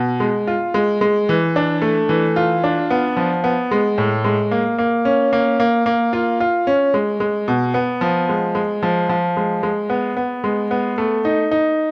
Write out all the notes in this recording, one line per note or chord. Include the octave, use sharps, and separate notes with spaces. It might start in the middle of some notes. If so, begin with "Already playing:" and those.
Already playing: B2
G#3
F4
G#3
G#3
E3
D4
A3
E3
F4
D4
B3
F3
B3
G#3
A2
G#3
A#3
A#3
C#4
A#3
A#3
A#3
F4
F4
C#4
G#3
G#3
B2
B3
F3
G#3
G#3
F3
F3
G#3
G#3
B3
B3
G#3
B3
A3
D#4
D#4